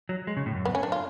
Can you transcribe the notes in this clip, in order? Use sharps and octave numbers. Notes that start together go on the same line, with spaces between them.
F#3
G#3
C#3
A2
F#2
B3
C#4
D4
F4